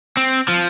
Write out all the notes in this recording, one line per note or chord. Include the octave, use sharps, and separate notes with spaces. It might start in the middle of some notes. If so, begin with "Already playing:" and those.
C4
F3